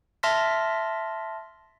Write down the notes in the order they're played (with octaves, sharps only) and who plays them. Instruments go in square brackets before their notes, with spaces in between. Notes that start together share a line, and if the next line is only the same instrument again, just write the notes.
[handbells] E5 A5 C6 F6 A#6 B6